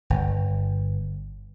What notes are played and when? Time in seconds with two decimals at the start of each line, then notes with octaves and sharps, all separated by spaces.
0.10 G1